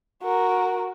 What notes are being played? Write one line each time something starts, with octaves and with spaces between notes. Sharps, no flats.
F#4 A#4